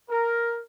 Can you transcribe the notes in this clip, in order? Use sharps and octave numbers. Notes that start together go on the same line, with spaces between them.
A#4